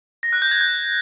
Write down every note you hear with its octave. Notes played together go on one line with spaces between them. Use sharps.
A#6
F#6
G6
G#6
G6